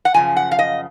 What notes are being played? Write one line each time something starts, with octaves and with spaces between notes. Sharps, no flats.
F#5
F#2 C#3 F3 G#5
F#5
F5
D#5